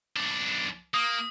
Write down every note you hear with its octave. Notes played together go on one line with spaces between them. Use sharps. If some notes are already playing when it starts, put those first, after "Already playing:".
B1 D4
A#3 D#6